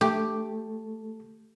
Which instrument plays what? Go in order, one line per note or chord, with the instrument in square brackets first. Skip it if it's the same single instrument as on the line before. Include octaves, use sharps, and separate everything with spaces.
[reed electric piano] A3 A4 [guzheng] G4